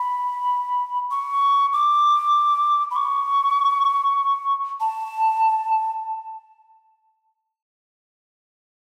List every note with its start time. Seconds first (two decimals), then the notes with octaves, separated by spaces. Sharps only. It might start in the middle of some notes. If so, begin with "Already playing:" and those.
Already playing: B5
1.11 C#6
1.73 D6
2.91 B5
2.96 C#6
4.80 A5